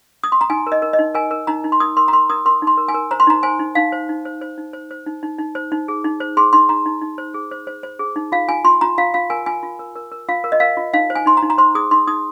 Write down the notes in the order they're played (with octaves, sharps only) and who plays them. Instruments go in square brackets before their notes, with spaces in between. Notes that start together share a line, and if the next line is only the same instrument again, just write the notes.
[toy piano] D#6
C6
A#5
D#4 G#5
A#4
D#5
A#4
D#5
D#4
A#4 G#5
A#4
D#4 A#5
D#4
C6
A#4 D#6
A#4 C6
A#5
A#4 C6
A#4 D#6
A#4 C6
D#4
C6
A#4
G#5
A#4
C5 A#5
C6
D#4 A#5
C5 G#5
D#4
D#4 F5
C5
D#4
C5
C5
D#4
C5
C5
D#4
D#4
D#4
C5
D#4
G#4
D#4
C5
G#4 C6
D#4 C6
D#4 A#5
D#4
D#4
C5
G#4
C5
C5
C5
G#4
D#4
F4 F5
F4 G#5
F4 C6
F4 A#5
F4 F5
F4 F5
A#4 G#5
F4 G#5
F4
A#4
A#4
A#4
F4 F5
A#4
D#5
A#4 F5
F4
D#4 F5
C5
G#5
D#4 C6
A#5
D#4
A#5
C5 C6
G#4 D#6
D#4 C6
D#4 D#6